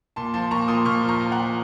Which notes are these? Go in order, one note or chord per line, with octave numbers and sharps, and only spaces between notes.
A#2 A5 C6
F3 A5 C6
A#2 A#5 C#6
A#2 C6 D#6
A#2 C#6 F6
F3
A#5 C#6
F3
F#5 A#5
F3